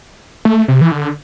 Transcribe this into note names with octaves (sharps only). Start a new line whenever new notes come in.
A3
C3
E3
D3